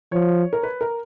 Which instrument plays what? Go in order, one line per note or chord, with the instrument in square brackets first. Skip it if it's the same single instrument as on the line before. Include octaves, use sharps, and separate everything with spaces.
[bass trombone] F3 [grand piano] C#5
[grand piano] A#4
B4
A#4